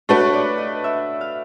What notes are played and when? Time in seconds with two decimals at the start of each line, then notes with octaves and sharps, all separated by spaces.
0.09 A3 D4 F#4 B4 C#5
0.33 D5
0.58 D#5
0.84 E5
1.21 F5